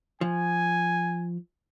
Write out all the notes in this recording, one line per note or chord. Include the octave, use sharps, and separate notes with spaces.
F3 G#5